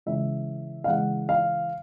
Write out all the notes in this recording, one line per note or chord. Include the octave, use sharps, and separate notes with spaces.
C#3 E3 G#3 E5
F5
C#3 E3 G#3 F#5
F5